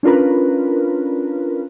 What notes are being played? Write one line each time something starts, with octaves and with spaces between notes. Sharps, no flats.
C#4 D4 F4 A#4 B4